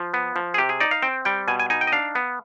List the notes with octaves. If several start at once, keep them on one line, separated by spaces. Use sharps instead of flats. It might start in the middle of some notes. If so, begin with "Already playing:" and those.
Already playing: F3 F4
B3
F3
G#4
C3 G4
G#4
D#4 D5
F5
C4 G5
G3 G5
B2 G#5
G#5
D#4 G#5
G5
D#5
D4 F5
B3